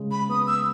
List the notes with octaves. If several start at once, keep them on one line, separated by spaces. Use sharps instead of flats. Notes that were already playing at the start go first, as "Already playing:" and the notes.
Already playing: C#3 G#3
B5
B3 D#6
E6